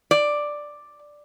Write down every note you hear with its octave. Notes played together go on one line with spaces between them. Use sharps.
D5